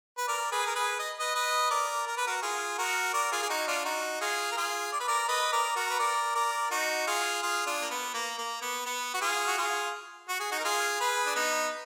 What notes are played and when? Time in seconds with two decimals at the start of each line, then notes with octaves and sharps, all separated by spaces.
0.18 B4
0.28 A#4 D5
0.52 G#4 B4
0.67 A#4
0.76 G#4 B4
0.99 D#5
1.20 B4 D#5
1.35 B4 D#5
1.71 A#4 D5
2.07 A#4
2.17 B4
2.27 F#4 A#4
2.42 F4 G#4
2.78 F#4 A#4
3.14 A#4 D5
3.32 F4 G#4
3.42 G#4
3.50 D#4 F#4
3.68 D4 F4
3.85 D#4 F#4
4.21 F4 G#4
4.52 A#4
4.57 F4 G#4
4.93 D5
5.00 B4
5.08 A#4 D5
5.28 B4 D#5
5.52 A#4 D5
5.76 F#4 A#4
5.90 B4
6.00 A#4 D5
6.35 A#4 D5
6.71 D#4 F#4
7.07 F4 G#4
7.42 F4 G#4
7.66 D4 F4
7.82 A#3
7.90 B3
8.14 A#3
8.38 A#3
8.62 B3
8.86 B3
9.14 F#4
9.21 F4 G#4
9.47 F#4
9.57 F4 G#4
10.29 F#4
10.40 G#4
10.51 D#4 F#4
10.59 A#4
10.64 F4 G#4
11.00 G#4 B4
11.26 D4
11.36 B3 D#4